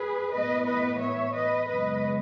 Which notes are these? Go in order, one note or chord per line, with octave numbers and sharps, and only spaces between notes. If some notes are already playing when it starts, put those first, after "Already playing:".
Already playing: G#4 B4
A2 E3 B3 B4 D#5
B4 D#5
C#5 E5
B4 D#5
F#2 C#3 G#3 B3 B4 D#5